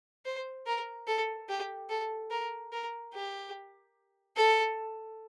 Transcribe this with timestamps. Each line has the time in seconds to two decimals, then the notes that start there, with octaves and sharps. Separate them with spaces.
0.25 C5
0.66 A#4
1.07 A4
1.49 G4
1.90 A4
2.31 A#4
2.72 A#4
3.14 G4
4.37 A4